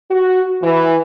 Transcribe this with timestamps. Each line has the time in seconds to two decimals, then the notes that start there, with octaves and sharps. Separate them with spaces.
0.10 F#4
0.63 E3